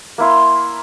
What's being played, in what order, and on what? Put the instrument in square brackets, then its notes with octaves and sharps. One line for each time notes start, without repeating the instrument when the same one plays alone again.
[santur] A#3 E4 C6